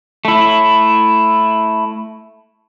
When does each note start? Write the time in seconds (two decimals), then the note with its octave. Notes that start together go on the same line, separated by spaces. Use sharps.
0.25 A3 E4